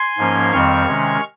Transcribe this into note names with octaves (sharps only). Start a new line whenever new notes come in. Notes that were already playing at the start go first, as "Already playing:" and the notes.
Already playing: G#5 C6
G#2 F3 A#3 C#4
F2 D#3 G3 C4 C#6 F6
C3 D#3 G#3 C#4